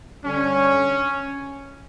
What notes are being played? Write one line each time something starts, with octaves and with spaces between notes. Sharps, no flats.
G2 D3 G3 C#4